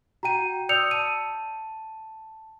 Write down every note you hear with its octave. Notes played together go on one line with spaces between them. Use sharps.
F#4 G5 A#5 D#7
D5 D#6 E6 G6 C#7 F7
A5 D#7